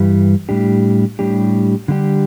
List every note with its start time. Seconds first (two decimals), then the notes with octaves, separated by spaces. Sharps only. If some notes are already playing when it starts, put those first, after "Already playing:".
Already playing: G2 E3 G3
0.49 A2 G3 D4 G4
1.19 A2 G3 D4 G4
1.88 D3 G3 D4 G4